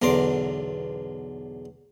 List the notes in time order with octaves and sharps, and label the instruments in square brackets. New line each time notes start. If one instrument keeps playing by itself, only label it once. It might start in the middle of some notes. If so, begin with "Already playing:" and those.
[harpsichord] B1 E2 D3 A#5 C6 D6